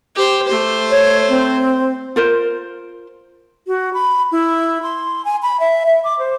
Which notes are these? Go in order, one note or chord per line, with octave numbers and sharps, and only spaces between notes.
G4 C5
A3 C5
C#5
C4
F4 A#4 C5
F#4
B5
E4
C6
G#5
B5
E5
E5
D6
C5